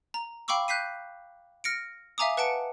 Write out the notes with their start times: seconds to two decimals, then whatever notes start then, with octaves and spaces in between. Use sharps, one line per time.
0.14 A#5
0.48 F5 G5 B5 C#6 D6 E6
0.68 F#6 G6 B6 C7 D#7
1.64 F6 A#6 C#7 D7
2.18 E5 F5 G#5 A#5 D6 D#6
2.37 B4 F#5 A5 C#7 D7